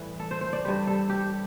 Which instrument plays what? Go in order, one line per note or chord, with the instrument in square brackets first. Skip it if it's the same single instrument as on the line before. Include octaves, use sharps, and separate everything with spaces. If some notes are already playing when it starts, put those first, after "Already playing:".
Already playing: [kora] A2 E3 G3
A4
C5
C5
D5
G2 G3 C5
A4
G4